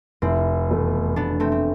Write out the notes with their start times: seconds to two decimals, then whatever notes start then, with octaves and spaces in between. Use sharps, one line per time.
0.22 F1 C4 E4
0.69 E2 B2 A3
1.16 F1 B3 D4
1.40 A3 C4
1.52 C4